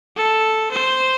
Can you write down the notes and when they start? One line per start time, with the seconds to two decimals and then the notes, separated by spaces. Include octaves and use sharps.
0.17 A4
0.72 C5